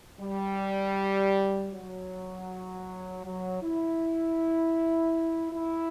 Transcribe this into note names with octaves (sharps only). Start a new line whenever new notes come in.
G3
F#3
F#3
E4
E4